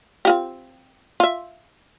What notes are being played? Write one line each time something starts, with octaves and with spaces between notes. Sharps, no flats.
C4 F4 G4
F4 E5